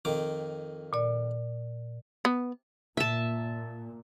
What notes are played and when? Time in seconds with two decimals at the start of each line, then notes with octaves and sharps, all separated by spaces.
0.05 F2 D#3 D6
0.93 A#2 D5
2.25 B3
2.97 A#2 E5 A5